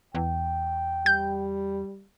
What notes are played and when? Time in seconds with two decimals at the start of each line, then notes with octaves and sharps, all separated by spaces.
0.15 E2 G5
1.06 G3 G6